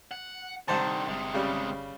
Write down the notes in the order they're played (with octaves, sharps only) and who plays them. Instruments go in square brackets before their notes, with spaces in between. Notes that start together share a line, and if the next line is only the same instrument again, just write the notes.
[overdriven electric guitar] F#5
[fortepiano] C2 C5 A5 [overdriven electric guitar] D3 D#3
[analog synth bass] G1 [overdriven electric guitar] C3 G#3
[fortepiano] C#3 G3